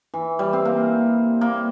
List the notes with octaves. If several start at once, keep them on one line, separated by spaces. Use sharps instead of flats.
E3
G3
C4
A#3
A#3